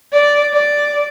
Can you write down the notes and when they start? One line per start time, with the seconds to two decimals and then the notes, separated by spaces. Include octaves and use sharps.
0.13 D5
0.53 D5